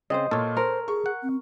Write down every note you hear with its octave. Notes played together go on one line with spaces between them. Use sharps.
C#3 C4 C5 D#5
A#2 A#3 A4 C#5
A#4 C5 C6
G#4 C#6
F#5
C4